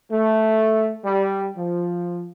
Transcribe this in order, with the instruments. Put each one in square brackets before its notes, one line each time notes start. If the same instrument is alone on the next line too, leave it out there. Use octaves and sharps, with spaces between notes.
[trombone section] A3
G3
F3